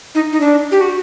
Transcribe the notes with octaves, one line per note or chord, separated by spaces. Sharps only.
D#4
D#4
D4
G4
F#4